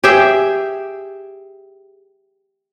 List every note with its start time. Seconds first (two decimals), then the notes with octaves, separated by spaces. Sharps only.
0.04 G4 G#4 E5 G5